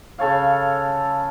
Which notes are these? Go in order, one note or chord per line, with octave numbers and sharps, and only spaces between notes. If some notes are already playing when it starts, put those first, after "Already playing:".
C#3 A4 C#5 F5